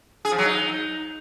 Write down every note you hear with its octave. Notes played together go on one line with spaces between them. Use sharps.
G#4
F3
F#3
D#4